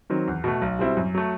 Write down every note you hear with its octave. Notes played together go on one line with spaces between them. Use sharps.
D#3 F#3 C4
E2
B2 A3
B1
B2 G3 C4 E4
F#2
F#3 A3